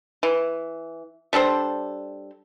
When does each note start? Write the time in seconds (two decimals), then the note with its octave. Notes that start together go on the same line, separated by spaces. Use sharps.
0.23 E3
1.33 G3 D4 A4 C5